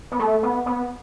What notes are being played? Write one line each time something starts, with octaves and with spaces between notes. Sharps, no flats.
B3
A3
B3
B3